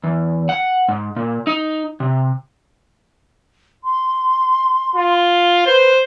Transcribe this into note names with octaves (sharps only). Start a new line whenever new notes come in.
E2
F#5
G#2
A#2
D#4
C3
C6
F4
B4 C5